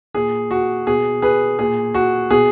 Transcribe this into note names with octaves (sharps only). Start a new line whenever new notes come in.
A#2 G#4
F#4
B2 G#4
G#4 B4
A#2 G#4
F#4
B2 G#4